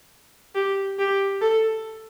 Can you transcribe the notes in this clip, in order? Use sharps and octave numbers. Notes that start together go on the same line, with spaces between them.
G4
G4
A4